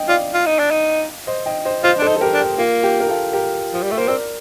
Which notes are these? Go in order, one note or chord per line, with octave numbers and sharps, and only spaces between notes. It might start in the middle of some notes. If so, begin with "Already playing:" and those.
Already playing: D#5 G5
F4 D5 F5
F4
D#4
D4
D#4
C5 D#5
D#5 G5
C5 D#5
F4 C5 D#5
D4 A4 C5
D#4
A4
G4 A#4
D4
G4
A#3 F4
G4
A#4
F4 A4
G4 A#4
F3
G3
A3
A#3 C5
C4 A#4 D5